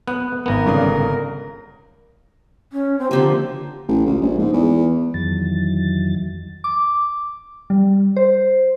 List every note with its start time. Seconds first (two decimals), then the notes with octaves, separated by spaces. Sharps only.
0.07 B3 F#6
0.46 G#1 B3 A#4
0.65 G1 C#3 D5
2.73 C#4
2.99 C4
3.11 D3 F3 A#3 G4
3.88 A1
4.06 C#2
4.21 A#1
4.39 G#2
4.53 E2
5.14 F2 D#3 E3 F#3 A6
6.64 D6
7.70 G3
8.16 C5